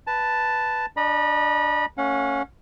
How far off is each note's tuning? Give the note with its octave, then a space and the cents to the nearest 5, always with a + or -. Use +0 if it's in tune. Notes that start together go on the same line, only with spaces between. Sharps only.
B4 +0 A5 +0
D4 +0 D#5 -35 B5 -35
A3 +45 C#4 +0 F#5 -40